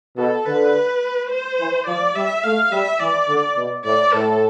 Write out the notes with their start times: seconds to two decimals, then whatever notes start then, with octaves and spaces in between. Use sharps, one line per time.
0.17 B2 A4
0.46 D3 B4
1.30 C5
1.59 E3
1.86 F3 D5
2.15 G3 E5
2.43 A3 F5
2.71 G3 E5
2.99 E3 D5
3.28 D3
3.57 B2
3.85 A2 D5
4.13 A2 A4